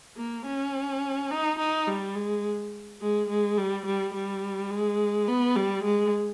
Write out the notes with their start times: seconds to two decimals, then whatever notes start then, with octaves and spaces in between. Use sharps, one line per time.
0.17 A#3
0.46 C#4
1.31 D#4
1.59 D#4
1.87 G3
2.15 G#3
3.01 G#3
3.30 G#3
3.57 G3
3.86 G3
4.14 G3
4.70 G#3
5.28 B3
5.56 G3
5.84 G#3